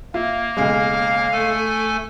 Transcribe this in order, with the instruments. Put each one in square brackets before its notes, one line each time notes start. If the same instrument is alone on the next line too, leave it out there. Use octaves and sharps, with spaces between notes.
[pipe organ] A#3 [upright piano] F4 E5
[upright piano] B1 C#3 G#3 [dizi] F5
[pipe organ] A3 A4 G#5